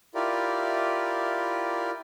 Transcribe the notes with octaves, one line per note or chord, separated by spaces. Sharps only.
E4 F4 G4 A#4 D5